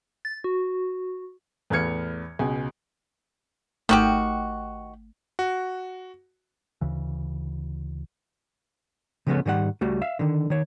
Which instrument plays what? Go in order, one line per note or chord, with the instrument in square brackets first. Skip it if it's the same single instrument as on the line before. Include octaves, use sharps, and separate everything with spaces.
[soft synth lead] A6
F#4
[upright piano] E2 A2 B4 F6 G#6 C#7
C#2 B2 G#5
[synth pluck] G#1 A3 [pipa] D#3 F#4 G4
[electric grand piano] F#4
[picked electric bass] D2 C#3 E3
[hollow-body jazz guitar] C#3 F3 G#3 A3 B3 C#4
G#2 D#3 G3 C#5 F#5
C#2 G3 A3 F#4
E5 F5
D3 D#3
D#3 C#5